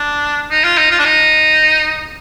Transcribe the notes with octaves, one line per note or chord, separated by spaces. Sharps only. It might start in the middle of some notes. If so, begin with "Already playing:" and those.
Already playing: D4
D#4
F4
D#4
F4
D4
D#4